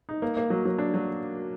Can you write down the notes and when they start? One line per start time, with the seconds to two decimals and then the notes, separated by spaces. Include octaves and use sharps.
0.09 D#4
0.22 A#3
0.37 A#3
0.50 F#3
0.65 F#3
0.78 D4
0.94 F#3